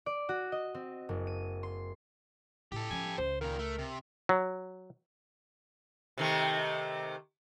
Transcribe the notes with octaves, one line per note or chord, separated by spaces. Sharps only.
D5
F#4
D#5
C4
F#1
D#7
C6
A2 G4 A4
F3 C#4 G#5
C#2 C5
A#2 D#3 A#4
A3
C3
F#3
C3 D#3 A3